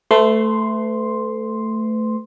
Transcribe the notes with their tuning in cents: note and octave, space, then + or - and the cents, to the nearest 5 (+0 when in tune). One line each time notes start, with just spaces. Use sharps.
A3 +0 B4 +40 C6 +0